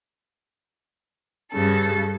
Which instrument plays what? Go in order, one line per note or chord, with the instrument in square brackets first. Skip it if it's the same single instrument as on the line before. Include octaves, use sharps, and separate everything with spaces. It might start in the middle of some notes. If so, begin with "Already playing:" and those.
[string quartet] G2 C#3 A4